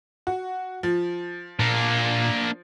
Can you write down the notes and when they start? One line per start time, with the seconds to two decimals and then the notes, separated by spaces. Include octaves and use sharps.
0.27 F#4
0.83 F3
1.59 A#2 A#3 D4